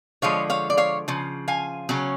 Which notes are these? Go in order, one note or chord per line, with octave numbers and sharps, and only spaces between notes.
D3 F3 G#3 C#5 F5
C#5 F5
D5
C#5 F5
C#3 F3
F5 G#5
C#3 F#3 C#4